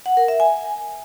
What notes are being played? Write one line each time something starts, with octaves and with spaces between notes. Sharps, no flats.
F#5
A#4
E5
G#5